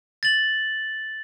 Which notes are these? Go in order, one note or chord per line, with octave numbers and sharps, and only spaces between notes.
A6 F#7